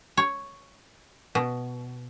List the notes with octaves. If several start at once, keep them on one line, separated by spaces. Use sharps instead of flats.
C#5
B2